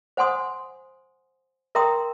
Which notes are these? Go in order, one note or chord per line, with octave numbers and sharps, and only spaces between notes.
C5 F#5 G#5 C6 D#6
A#4 E5 G5 A#5 C6 D#6